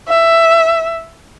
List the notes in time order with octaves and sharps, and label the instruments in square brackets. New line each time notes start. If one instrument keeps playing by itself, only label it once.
[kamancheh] E5